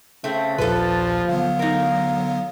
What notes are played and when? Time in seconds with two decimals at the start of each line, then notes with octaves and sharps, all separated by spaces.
0.24 C#3 A3 C4
0.58 A#1 D#2 A#2 F3 A4 B4
1.29 D3 F#3 B3 F5
1.59 D2 D#4 A#4